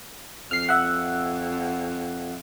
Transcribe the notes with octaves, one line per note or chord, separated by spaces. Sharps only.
F2 F6 C7
E5 F#5